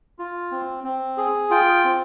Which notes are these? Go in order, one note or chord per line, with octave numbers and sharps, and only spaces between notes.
F4
C4
C4
G#4
F4 G5
C4